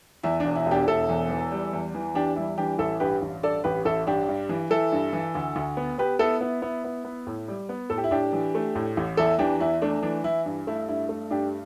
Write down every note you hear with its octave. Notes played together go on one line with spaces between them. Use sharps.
E2 E4
E1 D4
E4
E1
D4 G4
E1 E4 A4
E2
E3
G3
E2
E3
E2 D4 G4
G3 E4
E3 D4 G4
A1 E4 A4
G2 G4 B4
A1
G2 A4 D5
A1 G4 B4
A1 E4 A4
G2 D4 G4
G2
E3
E3 E4 A4
G2
E3
D2
D2
B3
B3 G4 B4
B3 E4 A4
B3 E4
B3 E4
B3
B3
A2
G3
B3
A2 A4
G4
E4
A2 D4 G4
E3
A3
A2
A1
E2 E4 A4
E3 D4 G4
E2 E4
A3 D4
E3 D4
E3 E4
G2
A3 E4
G2 E4
A3
G2 D4 G4